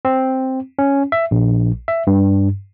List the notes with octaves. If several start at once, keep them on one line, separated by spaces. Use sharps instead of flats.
C4
C#4
E5
A#1
E5
G2